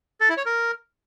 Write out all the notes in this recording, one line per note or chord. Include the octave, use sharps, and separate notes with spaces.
A4
E4
C#5
A#4